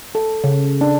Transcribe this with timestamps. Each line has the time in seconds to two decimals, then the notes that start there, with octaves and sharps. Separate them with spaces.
0.15 A4
0.44 C#3
0.81 D4